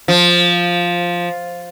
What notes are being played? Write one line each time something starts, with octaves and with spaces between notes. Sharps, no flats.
F3